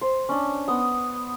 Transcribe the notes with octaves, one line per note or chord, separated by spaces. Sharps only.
C5
C#4 D4
B3 C6 D#6